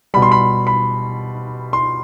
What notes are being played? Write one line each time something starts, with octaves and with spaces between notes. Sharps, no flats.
B2 G3 B5
C6
B5
B5
C6